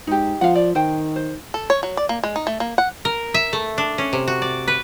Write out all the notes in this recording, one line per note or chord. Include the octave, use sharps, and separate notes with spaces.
G#2 D#4 G4
F3 F5 F#5
D5
D#3 C5 G5
C5
A4
C#5
F#3
D5
A#3
G#3
D#4
A3
A#3
F#5
A#4
E5
A3
D4
C#4
C3
F#4
D5
B4